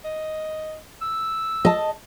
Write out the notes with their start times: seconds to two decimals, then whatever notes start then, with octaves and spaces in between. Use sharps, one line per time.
0.04 D#5
1.01 E6
1.65 D#5 A5